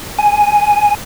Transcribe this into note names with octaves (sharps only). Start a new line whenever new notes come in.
G#5